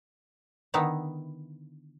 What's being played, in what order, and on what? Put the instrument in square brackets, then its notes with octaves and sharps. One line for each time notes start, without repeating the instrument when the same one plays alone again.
[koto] D3 D#3 B3 D#4 E4